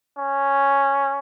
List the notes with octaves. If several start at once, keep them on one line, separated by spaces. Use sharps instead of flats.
C#4